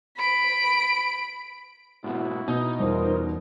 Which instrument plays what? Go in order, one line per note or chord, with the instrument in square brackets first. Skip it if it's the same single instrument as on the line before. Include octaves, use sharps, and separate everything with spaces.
[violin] B5 D7
[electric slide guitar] G#2 B2 [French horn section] E4 F#4
[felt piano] B2 [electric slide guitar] D#4
[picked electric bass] E2 G3 [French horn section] F4 A#4 C5